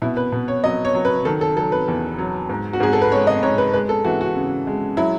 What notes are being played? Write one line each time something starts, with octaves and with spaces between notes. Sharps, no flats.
B2 E4
B4
B2
C#5
F#3 D#5
C#5
F#3
B4
D#3 A4
A4
F#3 A4
B4
E2
F#3
G#2
F#4
G#2 G#4
A4
B4
G#3 C#5
D#5
G#2 C#5
B4
G#3 B4
A4
E3 F#4
F#4
C#3
G#3
F#3 E4